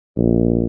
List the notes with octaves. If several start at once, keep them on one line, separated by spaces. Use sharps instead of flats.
A#1